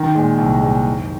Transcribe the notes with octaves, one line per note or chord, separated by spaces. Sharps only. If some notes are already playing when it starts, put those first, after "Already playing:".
Already playing: D#3
A#2 G#3
C2
A#2 G#3
F#1